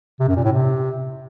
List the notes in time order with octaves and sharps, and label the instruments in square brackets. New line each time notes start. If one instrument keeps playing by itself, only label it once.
[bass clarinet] C3
F#2
A#2
A2
C3